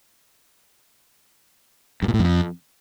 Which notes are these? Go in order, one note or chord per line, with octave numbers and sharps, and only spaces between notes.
G2
A#2
A2
F2